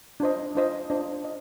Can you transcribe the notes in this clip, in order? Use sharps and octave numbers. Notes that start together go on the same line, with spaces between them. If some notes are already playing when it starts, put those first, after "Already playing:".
D4 F4 C5 D#5
D4 F4 C5 D#5
D4 F4 C5 D#5
D#5